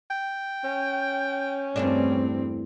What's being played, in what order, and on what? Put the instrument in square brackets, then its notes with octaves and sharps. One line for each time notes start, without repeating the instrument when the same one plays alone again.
[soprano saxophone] G5
[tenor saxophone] C#4
[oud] E2 A3 D4 [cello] G2 C4